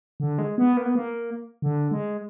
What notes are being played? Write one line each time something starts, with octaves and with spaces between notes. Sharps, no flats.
D3
G#3
B3
A#3
B3
A#3
D3
G#3